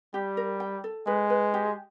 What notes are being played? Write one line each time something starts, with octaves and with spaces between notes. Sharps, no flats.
G3 G4
A#4
G5
A4
G#3 B4
B4
G4